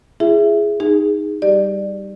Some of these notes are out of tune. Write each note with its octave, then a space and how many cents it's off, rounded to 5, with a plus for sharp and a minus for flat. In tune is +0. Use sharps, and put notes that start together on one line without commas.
E4 +40 G#4 +0 E5 +5
D#4 +0 G#4 -20
G3 +0 G4 +0 D5 +20